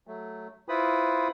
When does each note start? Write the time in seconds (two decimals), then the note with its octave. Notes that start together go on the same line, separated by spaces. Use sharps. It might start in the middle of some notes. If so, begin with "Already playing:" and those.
0.07 F#3 A3
0.69 E4 F4 B4 C5 B5 D#6